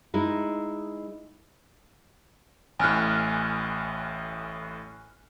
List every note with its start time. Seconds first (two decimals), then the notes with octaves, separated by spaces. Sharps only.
0.14 G#3 D#4 E4
2.79 A1 A2 G#5 F6 F#6